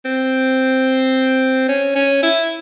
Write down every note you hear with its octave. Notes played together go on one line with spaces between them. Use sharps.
C4
C#4
C#4
E4